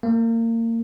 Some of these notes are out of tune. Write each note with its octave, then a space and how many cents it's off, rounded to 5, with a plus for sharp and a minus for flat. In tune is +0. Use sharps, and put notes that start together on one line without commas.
A#3 -30